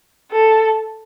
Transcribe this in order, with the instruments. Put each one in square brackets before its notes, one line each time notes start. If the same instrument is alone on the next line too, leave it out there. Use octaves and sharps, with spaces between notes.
[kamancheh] A4